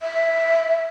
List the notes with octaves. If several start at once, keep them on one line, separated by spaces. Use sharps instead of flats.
E5